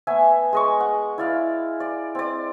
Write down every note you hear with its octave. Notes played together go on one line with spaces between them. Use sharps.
A3 B3 E5 G#5
G#3 D#5 C#6
F#5
E4 D5 F5
D5
C4 D5